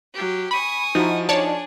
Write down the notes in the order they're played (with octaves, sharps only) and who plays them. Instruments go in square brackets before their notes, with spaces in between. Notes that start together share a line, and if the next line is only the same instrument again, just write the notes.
[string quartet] F#3 G4
[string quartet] G#5 C#6 D#6 [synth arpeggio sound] B5
[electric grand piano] F3 E4 [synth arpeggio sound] D#4 F#4
[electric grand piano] F3 [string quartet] D4 G#4 [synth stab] C#5 D5 A5